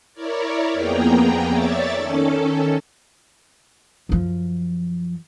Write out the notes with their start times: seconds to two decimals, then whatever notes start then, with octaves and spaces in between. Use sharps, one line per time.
0.14 E4 A#4 C#5 D5
0.73 F2 A#3 B3 G#4 G5 A#5
1.47 C#5 D5 E5 A6
1.94 D#3 C#4 A4
4.09 F#2 F3